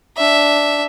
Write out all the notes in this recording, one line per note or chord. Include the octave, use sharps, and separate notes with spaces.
D4 E5